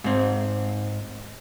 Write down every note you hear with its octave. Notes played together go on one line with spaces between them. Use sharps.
G#2 C4